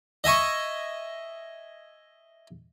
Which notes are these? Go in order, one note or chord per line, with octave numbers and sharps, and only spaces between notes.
D#5 E5 G#5 C#6